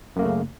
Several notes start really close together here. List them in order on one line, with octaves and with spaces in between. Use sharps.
F#2 A#3 A3 C#3